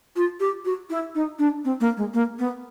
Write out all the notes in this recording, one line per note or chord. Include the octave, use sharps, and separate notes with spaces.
F4
G4
F#4
E4
D#4
D4
C4
A#3
G#3
A#3
B3